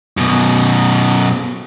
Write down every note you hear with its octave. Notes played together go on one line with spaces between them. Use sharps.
F#2 B2